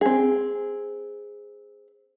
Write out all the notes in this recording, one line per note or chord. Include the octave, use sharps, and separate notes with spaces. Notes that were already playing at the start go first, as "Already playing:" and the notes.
C4 G#4